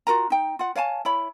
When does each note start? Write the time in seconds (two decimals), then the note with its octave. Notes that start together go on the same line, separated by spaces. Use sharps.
0.07 F4 F#4 A#4 A#5
0.30 D#4 G5
0.59 F4 F#5
0.75 C#5 F5 G#5 A5
1.05 E4 C#5 B5